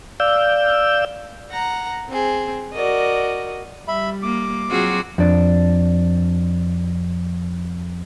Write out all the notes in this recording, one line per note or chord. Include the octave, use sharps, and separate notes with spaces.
D5 F5 E6 G6
F#5 A#5 A#6
C4 G#4 C5
F#4 A#4 D5 D#5
G3 E5 B5
A#3 D6
F#3 C4 F4 F#4 G#4
F2 D4